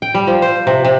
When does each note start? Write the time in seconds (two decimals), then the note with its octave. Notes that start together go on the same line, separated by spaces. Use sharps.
0.02 G5
0.14 G3
0.27 F3
0.42 C5
0.67 C3
0.85 C3